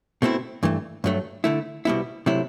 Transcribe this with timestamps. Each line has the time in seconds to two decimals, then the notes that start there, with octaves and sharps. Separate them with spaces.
0.22 B2 A3 C4 E4
0.63 G2 E3 A3
1.04 G2 F#3 A3
1.44 D3 A3 E4
1.85 C2 B2 G3 B3 E4
2.26 C3 F#3 A3 E4